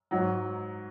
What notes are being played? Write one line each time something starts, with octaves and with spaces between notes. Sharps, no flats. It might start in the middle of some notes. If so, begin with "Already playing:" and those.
G#2 F#3 D#4